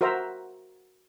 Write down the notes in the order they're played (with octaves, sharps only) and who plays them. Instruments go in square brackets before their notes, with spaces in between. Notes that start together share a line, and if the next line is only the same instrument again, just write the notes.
[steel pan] F#4 A#4 C5 E5 A#5